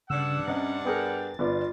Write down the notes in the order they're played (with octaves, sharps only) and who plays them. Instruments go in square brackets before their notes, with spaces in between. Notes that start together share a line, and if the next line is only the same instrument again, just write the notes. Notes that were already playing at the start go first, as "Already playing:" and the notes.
[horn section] G2 D4 F#5 [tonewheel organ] C#3 [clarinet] E6
[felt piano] C3 D#5 [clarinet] C#4 [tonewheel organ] A6
[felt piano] B3 G#4 A#4 [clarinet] G5
[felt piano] G1 B3 D5 [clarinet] F4